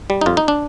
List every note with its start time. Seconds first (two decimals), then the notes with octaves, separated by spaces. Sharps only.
0.10 G3
0.21 D#4
0.26 F2 F4
0.37 D#4
0.48 D4